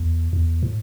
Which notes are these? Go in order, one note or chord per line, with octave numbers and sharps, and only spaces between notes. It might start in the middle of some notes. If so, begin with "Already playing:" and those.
Already playing: E2
E2
A2